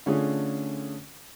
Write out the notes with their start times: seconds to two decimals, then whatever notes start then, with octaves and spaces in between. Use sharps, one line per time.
0.06 D3 A3 C#4 D4 F4 G#4